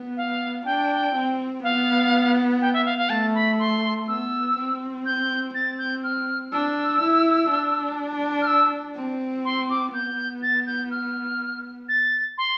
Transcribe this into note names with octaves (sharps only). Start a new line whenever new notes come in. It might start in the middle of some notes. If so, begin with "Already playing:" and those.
Already playing: B3
F5
D4 G5
C4
B3 F5
G5
E5
F5
F5
A3 A5
B5
C6
B3 E6
C4
G6
C4 A6
G6
F6
D4 E6
E4
D4
F6
E6
C4
C6
D6
B3 G6
A6
G6
F6
A6
C6